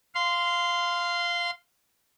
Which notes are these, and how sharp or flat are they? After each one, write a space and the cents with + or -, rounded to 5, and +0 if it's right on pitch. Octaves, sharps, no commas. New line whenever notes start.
F5 +0 C6 -15